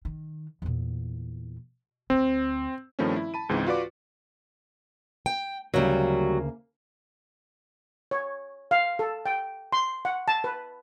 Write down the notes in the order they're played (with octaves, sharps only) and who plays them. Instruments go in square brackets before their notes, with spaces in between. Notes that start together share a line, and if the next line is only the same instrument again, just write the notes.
[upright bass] D#3
E2 A#2
[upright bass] D2 [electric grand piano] C4
[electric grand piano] G2 D#3 F3 A3 C4 C#4
E4
A5 B5 D#7
C#2 G#2 E3 C4
F4 F#4 B4 D5 D6
[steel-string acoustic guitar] G5
[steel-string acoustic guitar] D2 C#3 A#3 [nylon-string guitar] F#3 G3
[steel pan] C#5
F5
A4
G5
C6
F#5
A5
B4